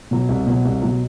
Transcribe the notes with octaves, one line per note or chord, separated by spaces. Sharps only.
B2 F#3
C2
B2 F#3
C2
B2 F#3